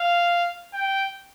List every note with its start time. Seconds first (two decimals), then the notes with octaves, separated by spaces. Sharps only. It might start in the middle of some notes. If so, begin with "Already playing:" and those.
Already playing: F5
0.73 G5